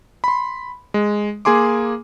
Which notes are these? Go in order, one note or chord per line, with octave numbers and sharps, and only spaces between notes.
B5 C6
G#3
A#3 G#4 G#5 C6 D6